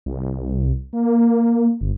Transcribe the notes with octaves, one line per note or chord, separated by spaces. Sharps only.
C2
A#3
G1